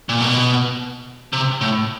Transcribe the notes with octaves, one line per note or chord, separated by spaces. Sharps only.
A#2
B2
C3
A2